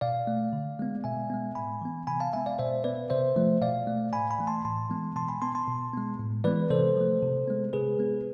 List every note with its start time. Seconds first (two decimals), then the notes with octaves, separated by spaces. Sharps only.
0.01 B2 D5 F5
0.27 A3
0.53 D3
0.79 G#3 B3
1.04 B2 E5 G#5
1.30 G#3 B3
1.55 A2 G#5 B5
1.81 E3 B3
2.07 C3 G#5 B5
2.20 F5 A5
2.33 G#3 B3 E5 G#5
2.46 D5 F5
2.59 B2 C5 E5
2.84 B3 B4 D5
3.10 C3 C5 E5
3.36 F3 A3
3.61 B2 D5 F5
3.87 A3
4.13 A2 G#5 B5
4.30 G#5 B5
4.39 E3 A3
4.47 A5 C6
4.65 A2 A5 C6
4.90 E3 G#3 B3
5.16 B2 A5 C6
5.28 G#5 B5
5.42 B3 A5 C6
5.55 A5 C6
5.67 B2
5.93 G#3 B3
6.19 A2
6.44 E3 G#3 B3 B4 D5
6.70 C3 A4 C5
6.96 F3 A3
7.22 C3
7.48 G#3 B3
7.73 C3 G#4 B4
7.99 G#3 B3